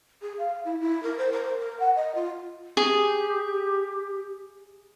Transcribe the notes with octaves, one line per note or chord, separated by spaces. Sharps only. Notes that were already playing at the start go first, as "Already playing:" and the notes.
G#4
F5
E4
E4
A#4
C5
A#4
C5
A#4
F#5
D#5
F4
G4 G#4